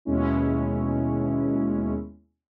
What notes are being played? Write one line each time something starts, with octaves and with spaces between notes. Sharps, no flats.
D#2 B2 G#3 C#4 E4